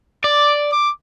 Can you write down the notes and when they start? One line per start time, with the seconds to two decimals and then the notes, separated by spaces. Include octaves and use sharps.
0.24 D5 D6
0.72 D6